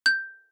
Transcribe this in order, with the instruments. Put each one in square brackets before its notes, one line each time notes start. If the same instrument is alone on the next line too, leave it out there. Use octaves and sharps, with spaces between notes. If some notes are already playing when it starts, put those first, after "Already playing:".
[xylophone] G6